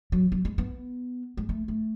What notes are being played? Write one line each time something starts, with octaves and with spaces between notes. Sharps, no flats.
F#3
F#3
G#3
B3
G#3
A3
A3